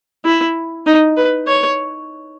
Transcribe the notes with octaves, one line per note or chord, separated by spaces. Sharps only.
E4
D#4
B4
C#5